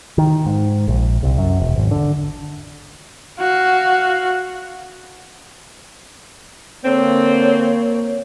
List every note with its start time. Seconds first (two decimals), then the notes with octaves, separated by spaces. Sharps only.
0.18 D#3
0.46 G#2
0.88 A#1
1.23 C2
1.38 F#2
1.60 E1
1.76 G#1
1.91 D3
3.39 F#4 F5
6.85 D3 A#3 C4 C#5